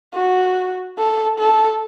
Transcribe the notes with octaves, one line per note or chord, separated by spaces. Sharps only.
F#4
A4
A4